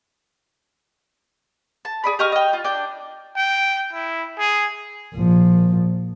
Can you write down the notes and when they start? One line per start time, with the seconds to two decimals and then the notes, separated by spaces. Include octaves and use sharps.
1.85 A5
2.04 G#4 D5 B5
2.19 G4 D#5 C#6 F6
2.32 D#5 G5
2.53 F4
2.64 D4 G5 G6
3.36 G5
3.93 E4
4.39 G#4
5.14 A#1 F3